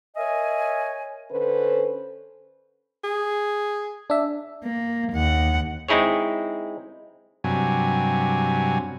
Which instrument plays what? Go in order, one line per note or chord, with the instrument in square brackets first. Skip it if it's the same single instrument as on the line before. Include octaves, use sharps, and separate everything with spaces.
[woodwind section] A#4 C#5 D#5 E5 G#5
[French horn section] D3 C#4 A4 B4 C5
[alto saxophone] G#4
[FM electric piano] D4 E5
[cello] A#3
D#2 F#5
[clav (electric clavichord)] G#3 C4 D#4 E4 G#4 C#5
[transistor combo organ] G2 C3 F#3 G#5